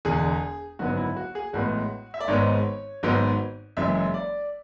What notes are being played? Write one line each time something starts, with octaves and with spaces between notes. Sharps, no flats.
E1 E2 D3 G#4
G#1 F#2 D3 F#3 B3 F#4
E4
F#4
G#4
A1 A2 G#3 B3 F#4
E5
D5
G#1 G#2 G#3 B3 C#5
G#1 G#2 F#3 B3
F#1 F#2 E3 G#3 E5
E5
D5